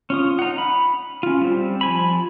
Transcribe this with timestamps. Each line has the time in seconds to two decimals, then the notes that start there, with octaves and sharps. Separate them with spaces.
0.10 C#4 F4 D#6
0.39 D#4 F#5
0.58 B5
1.23 C#4 F4
1.41 G3 C4
1.81 F3 G#5 B5